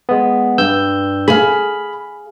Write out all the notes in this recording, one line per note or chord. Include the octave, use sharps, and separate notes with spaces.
G#3 B3
G2 E6 G6
G#4 F5 B5